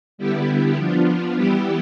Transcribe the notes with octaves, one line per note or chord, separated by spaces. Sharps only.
D3 G3 B3 E4 G4
F3 B3 D4 F4
E3 G3 B3 E4 G4